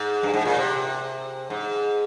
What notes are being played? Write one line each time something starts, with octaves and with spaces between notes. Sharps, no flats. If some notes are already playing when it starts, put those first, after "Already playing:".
Already playing: G#2
G2
G#2
A#2
C3
G#2